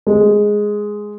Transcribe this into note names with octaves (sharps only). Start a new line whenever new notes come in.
G#3